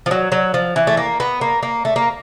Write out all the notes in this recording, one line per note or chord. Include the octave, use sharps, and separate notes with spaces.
F3
F#3
F#3
F3
E3
A3
A#3
B3
A#3
A#3
A3
A#3